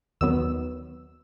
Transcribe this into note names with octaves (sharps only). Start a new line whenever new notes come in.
D#2 D#3 F#3 B3 E6